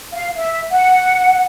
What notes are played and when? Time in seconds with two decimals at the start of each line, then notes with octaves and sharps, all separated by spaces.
0.13 F5
0.37 E5
0.71 F#5